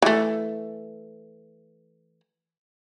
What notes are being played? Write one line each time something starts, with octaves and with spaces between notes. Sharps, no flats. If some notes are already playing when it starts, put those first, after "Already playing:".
E3 A3